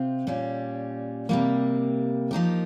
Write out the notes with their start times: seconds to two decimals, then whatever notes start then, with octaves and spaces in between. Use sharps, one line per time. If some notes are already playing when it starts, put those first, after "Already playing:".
Already playing: C3 C4 F4
0.27 A#2 G3 C#4
1.29 C3 G3 A#3
2.31 F3 A#3 D#4 G4